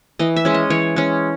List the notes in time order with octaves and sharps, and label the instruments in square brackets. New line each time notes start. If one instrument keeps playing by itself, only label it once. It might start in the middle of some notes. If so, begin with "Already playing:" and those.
[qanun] E3 D#5
E5
G#3 C#4
D#5
E3 C#5
G#3 C#4